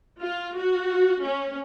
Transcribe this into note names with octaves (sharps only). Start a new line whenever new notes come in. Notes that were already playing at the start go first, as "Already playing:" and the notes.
F4
F#4
C#4